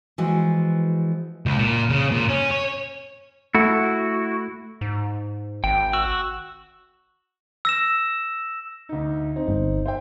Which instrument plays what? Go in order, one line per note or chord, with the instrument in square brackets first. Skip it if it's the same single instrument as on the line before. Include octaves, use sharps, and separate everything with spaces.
[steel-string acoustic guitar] E3 F3 G#3 F#4
[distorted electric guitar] C#2
A#2
C#3
A#2
C#4
C#5
[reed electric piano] A3 [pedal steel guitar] E4 F#4
[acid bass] G#2
[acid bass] G#1 [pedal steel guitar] G5
[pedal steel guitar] F#4 E6
[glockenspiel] E6 A#6 E7
[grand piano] D2 D#4
C4 D#4
[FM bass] G1
[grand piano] C5 E5 G5